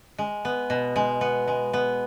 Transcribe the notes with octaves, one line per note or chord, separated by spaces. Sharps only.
G#3
B3
B2
G#3
B3
G#3
B3